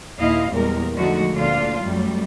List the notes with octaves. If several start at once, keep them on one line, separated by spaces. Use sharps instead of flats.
D#2 A#2 E4 D#5 F5
E2 A#2 G3 G#3 A#4
D3 F3 G#3 A3 D#4 F#4
D2 A#2 D3 D4 F4 F5
F#2 F#3 G3 A3